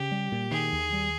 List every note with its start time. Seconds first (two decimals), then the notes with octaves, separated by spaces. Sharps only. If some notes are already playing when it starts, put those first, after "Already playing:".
Already playing: C#3 G4
0.12 G3
0.32 A#2
0.51 D#3 G#4
0.73 D#2
0.93 G3